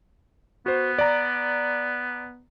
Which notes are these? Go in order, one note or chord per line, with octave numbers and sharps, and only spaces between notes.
B3 F#4 C5
D5 A#5